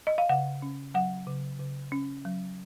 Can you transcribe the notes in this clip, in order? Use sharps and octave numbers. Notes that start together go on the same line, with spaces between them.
D#5
F5
C#3 F#5
C#4
F#3 F#5
C#3
C#3
C#4
F#3